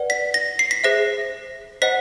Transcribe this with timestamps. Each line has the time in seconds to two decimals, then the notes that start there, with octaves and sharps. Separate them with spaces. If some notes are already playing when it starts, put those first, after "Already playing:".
Already playing: B4 D5 F#5
0.10 B6
0.34 A#6
0.59 C7
0.71 B6
0.84 G#4 C5 E5 A#6
1.82 C5 D#5 F#5 B6